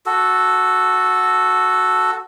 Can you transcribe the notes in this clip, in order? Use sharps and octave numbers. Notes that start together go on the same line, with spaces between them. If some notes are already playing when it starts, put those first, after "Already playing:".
F#4 A4